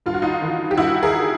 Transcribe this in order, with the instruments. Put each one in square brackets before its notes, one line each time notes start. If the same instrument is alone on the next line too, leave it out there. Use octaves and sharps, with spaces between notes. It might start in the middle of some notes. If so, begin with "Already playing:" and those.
[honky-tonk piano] G2 F4
F#4
D#4 F4
E3
G4
G2 E4 F#4
G#4 A#4